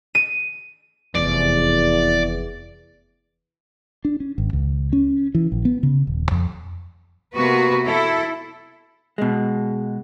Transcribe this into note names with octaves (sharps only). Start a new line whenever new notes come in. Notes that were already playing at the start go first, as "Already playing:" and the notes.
D#7
F1 E2 D5
D4
C#4
G#1
C#2
C#4
E3
A#1
B3
C#3
D#1
F2
C3 A#3 B3 F#4 B4
E4 A4
B2 G#3